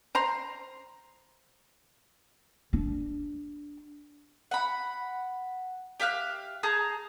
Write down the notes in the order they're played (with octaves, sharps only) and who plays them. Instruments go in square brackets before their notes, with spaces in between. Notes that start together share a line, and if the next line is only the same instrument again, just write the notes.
[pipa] C5 A#5 C6
[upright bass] D4
[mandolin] F#5 B5
G4 E5 F5 F#6
G#4 A5 A#5 G6